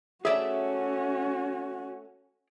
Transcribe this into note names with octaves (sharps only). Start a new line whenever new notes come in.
A3 C#4 F#4 G#4 C#5 D5 E5